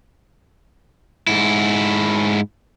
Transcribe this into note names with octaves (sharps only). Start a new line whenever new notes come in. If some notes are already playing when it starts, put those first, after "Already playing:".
G#2 E4